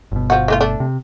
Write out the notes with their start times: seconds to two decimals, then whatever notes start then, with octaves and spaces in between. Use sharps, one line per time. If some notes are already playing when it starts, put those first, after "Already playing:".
0.12 G1 B2
0.30 F3 F#4
0.48 E3 A3 F4
0.61 A3 D4
0.80 C3